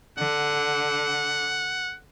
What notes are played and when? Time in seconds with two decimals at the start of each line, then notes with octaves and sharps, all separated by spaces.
0.18 D3 F#5